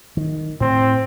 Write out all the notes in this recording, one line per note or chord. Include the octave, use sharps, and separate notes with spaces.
D#3
A2 C4